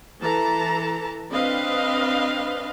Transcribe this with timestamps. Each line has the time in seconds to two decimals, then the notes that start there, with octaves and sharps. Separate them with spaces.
0.20 E3 A4 A5 A#5
1.30 C4 D4 B4 D#5 F5